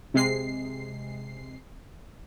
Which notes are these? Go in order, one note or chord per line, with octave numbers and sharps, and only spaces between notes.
C3 G#3 C7